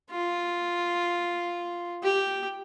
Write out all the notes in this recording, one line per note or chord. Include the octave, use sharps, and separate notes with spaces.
F4
G4